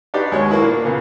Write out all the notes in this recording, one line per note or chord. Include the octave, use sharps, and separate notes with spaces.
D4 D#4 F#4 G4 B4 D5
D#2 G#3 B3 F#4 C#5
A#3 B3 E4 F#4
A#2 A#3 D4
A#2 C#3 A#3 B3